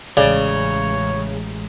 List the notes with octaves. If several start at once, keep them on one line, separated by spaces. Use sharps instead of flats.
A1 C#3 G#3 C#5 D5